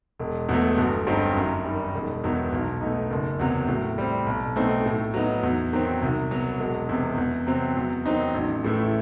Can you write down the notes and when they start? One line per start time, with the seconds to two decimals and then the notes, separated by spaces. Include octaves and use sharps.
0.19 E1
0.49 E2 B2 F#3 A3
0.78 G1
1.07 G2 F#3 C4 D#4
1.36 F#2
1.64 D#3 G3
1.95 E1
2.24 E2 D#3 F#3 B3
2.53 B1
2.81 B2 A3 D#4
3.10 F#1
3.39 E2 C3 F#3
3.68 A2
3.98 G3 C4
4.26 B1
4.56 B2 A3 C4 D#4
4.86 A2
5.14 F#3 B3 D#4
5.43 E2
5.73 D#3 F#3 C4
6.02 C2
6.31 B2 F#3
6.60 E1
6.89 E2 C3
7.18 E2
7.47 C3 F#3 C4
7.77 E2
8.06 D#3 F#3 C4 D#4
8.35 A1
8.64 A2 E3 A3 E4